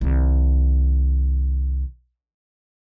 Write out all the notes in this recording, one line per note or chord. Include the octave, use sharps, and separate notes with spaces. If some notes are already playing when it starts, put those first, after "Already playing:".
C2 D#3